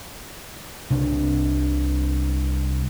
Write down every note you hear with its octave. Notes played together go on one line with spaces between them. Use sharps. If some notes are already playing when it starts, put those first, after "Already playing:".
C2 C3 D4